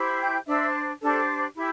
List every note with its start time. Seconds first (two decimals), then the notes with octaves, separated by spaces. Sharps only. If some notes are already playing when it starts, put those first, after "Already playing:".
Already playing: E4 G4 C5
0.19 G5 G6
0.47 D4 C5 E5 E6
1.01 D4 G4 A4 C5 A5
1.56 E4 G4